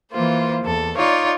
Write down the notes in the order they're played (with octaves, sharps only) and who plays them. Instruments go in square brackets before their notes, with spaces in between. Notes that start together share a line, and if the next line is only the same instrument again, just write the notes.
[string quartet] E3 A#3 F4 C5
E2 A4
D#4 F4 C#5 D5